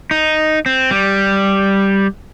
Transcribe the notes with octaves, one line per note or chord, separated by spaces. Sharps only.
D#4
C4
G3